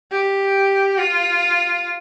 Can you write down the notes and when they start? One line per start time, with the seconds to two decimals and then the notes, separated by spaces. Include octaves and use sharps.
0.12 G4
0.98 F4